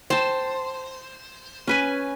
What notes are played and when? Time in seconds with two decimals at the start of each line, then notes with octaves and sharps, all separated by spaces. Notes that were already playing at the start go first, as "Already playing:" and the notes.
0.10 C5 G5 A5
1.67 C#4 B4 G#5